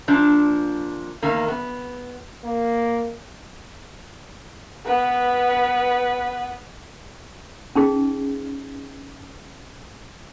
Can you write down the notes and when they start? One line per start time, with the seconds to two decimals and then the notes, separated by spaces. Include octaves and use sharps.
0.08 A#2 F3 D4
1.22 E2 D#3 A#3
1.48 B3
2.45 A#3
4.85 B3 B4
7.75 C#4 D#4 G#4